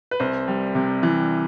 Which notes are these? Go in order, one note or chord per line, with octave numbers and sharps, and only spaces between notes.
B4
C2 C5
G3
C3
E3